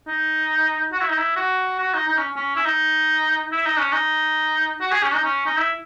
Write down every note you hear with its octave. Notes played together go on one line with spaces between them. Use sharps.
D#4
F#4
E4
D#4
E4
F#4
F#4
D#4
D#4
C#4
C#4
E4
D#4
E4
D#4
C#4
D#4
F#4
G#4
C#4
D#4
C#4
D#4
E4